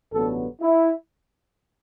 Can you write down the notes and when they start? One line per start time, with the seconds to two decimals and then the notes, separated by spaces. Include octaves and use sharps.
0.13 A1 G2 D3 F#3 B3 A4
0.61 E4